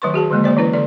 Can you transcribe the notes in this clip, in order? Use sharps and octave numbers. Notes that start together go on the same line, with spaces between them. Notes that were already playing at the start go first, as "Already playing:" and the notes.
D#3 F#3 A3 B4 C6 C#6
F#4 G#4 A5
D3 F3 G#3 A#3
F#3 A#3 C5 D5
E3 C#4 E4 B4
D3 A4 D5